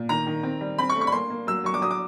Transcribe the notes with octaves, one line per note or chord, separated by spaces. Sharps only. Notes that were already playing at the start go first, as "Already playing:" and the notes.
Already playing: A#2
D#3 A#5
D#3
C4
G3
C4 B5
C#6
A3
C#6
B5
A#3 C6
A#3
F#3 E6
F#3 C#6
D6
F#3 D#6
D6